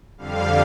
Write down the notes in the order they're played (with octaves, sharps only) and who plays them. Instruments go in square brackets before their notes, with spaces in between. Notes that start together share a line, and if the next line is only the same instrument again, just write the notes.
[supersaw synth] F2 D3 G3 F5